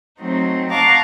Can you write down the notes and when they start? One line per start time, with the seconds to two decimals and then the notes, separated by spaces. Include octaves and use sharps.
0.20 F#3 A3 C4 D#4
0.71 F5 F#5 A5 A#5 C#6 D6